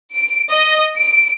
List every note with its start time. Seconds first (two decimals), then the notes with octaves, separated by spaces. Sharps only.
0.15 D7
0.51 D#5
0.98 D7